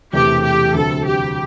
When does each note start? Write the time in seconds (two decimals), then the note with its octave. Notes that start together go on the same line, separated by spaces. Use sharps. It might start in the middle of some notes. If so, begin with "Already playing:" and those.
0.13 E1 E2 C3 E3 A3 G4
0.44 G4
0.74 D2 C3 F#3 A4
1.06 G4